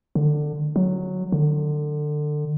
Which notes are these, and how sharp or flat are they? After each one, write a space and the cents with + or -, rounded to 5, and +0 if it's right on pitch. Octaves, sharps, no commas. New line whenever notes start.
D3 +20
F#3 -5
D3 +25